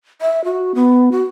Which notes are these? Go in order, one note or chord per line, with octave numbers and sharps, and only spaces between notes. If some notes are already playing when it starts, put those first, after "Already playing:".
E5
F#4
B3
F#4